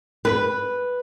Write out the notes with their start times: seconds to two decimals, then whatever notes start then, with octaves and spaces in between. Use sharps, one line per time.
0.25 B4